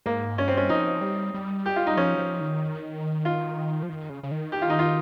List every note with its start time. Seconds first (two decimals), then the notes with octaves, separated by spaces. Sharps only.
0.06 G#2 A#3
0.38 G2 C#4
0.48 C4
0.57 C#4
0.69 F3 D#4
1.01 G3
1.34 G3
1.66 G4
1.76 F4
1.87 D#4
1.97 F3 C#4
2.18 F3
2.40 D#3
3.25 F4
3.83 F3
3.89 D#3
4.09 C#3
4.23 C#3
4.31 D#3
4.52 G4
4.62 F4
4.70 D#4
4.79 F4